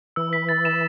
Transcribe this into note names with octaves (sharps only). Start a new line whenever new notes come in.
E3 E6
B6
A6
E7